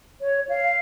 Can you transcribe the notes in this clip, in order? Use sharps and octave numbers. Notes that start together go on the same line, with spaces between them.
C#5
F5